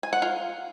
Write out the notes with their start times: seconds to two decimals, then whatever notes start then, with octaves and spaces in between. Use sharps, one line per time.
0.03 G#5
0.13 F#5
0.22 F4